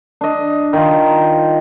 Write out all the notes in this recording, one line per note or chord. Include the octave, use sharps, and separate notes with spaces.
D4 D#5
D#3 D#4 F4